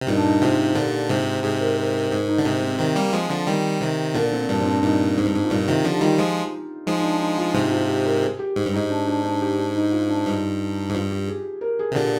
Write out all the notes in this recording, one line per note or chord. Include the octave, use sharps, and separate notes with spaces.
C3
G2 A#2 D#4
D4
D#4
G#2 C3 F4
A#2 D3 G4
G#2 C3
G#2 C3 G#4
A#4
A#4
A#4
G#2 G#4
D#4
D3
G#2 C3 D#4
C4
C3 D#3
G3 A#3
F3 G#3
D3 F3
D#3 G3
C3 D#3
A#2 D3 A#3
C4
G2 A#2 D4
C4
D4
G2 A#2 D#4
G#2
G2
G#2
F4
G2 A#2 D#4
C3 D#3 F4
D3 F3 G4
D#4
D#3 G3 F4
F3 G#3
F3 G#3 D#4
D#4
D4
D#4
F4
G#2 C3
F4
G4
A#4
G#4
G4
G#2
G2
G#2 D#4
D4
D4
D4
G4
D4
D#4
F4
D4
G2 D#4
G#2
G2 F4
G4
G#4
A#4
G#4
C3
A#2 D3 G4